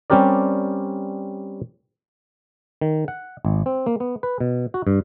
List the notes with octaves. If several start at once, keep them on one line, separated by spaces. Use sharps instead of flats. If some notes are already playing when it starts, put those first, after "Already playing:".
G3 C4 C#4 G4 A#4 D5
D#3
F#5
G#1
C4
A#3
B3
B4
B2
F#4
G2